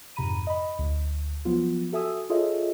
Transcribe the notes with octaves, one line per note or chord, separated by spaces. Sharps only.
F2 G#2 C3 A#5 B5 D#7
D#5 B5
D2
F3 F#3 B3 F4
F#4 A4 E5 G#5 D#6 E6
F4 G#4 A4 C#5 D#5 E5